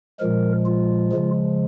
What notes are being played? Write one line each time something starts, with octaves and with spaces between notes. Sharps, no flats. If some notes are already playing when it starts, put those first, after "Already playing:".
A#2 F3 G#3 A#4
F4
C#3 F3 G#3